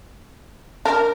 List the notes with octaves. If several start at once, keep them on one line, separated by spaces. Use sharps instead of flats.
D4 A#4